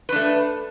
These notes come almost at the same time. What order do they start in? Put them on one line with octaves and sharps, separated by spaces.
B4 D4 A3